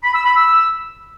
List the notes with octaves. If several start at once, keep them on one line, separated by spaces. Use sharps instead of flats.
B5
E6
B5
E6